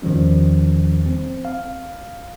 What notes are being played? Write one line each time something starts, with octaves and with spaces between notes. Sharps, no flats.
E2 D#3 F3 G3 C#4
C4
F5